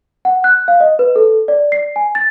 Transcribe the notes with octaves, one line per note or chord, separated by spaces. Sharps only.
F#5
F#6
F5
D#5
B4
A4
D5
C7
G#5
A6